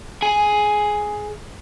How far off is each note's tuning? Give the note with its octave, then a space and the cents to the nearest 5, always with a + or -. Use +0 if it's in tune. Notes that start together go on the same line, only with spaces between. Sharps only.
G#4 +15 G#5 +0